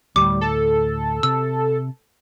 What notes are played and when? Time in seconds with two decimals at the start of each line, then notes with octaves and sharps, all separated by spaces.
0.16 D2 A2 G3 D6
0.41 A4
1.23 C3 E6